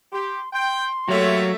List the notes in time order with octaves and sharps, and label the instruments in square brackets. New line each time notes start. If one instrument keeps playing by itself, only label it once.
[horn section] G4 [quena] C6
[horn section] G5 [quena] C6
[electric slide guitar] F#3 [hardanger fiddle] A3 E5 [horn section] A#3 G4 C#5